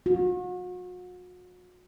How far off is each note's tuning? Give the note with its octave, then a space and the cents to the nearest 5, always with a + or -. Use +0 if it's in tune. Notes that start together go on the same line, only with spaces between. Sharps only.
F#4 -40